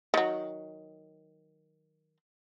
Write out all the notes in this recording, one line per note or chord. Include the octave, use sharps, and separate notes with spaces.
D#3 F#3